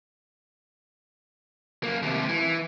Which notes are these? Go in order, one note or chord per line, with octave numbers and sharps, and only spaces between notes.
F#2 A#3
D#2 C3
E3